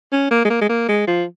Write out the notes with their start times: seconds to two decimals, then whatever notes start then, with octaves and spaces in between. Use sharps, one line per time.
0.12 C#4
0.31 A#3
0.45 G#3
0.50 A#3
0.61 G#3
0.69 A#3
0.88 G#3
1.07 F3